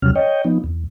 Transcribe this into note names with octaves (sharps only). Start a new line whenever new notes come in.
E2 C3 F#3 G3 C#4 F6
C#5 D#5 G5
F3 B3 D#4
E2